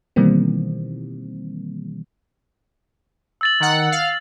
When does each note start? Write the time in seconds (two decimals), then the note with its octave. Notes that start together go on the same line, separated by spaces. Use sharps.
0.16 B2 D#3 E3 G3 A#3 C4
3.41 E6 A6 F#7
3.60 D#3 F#5
3.92 F5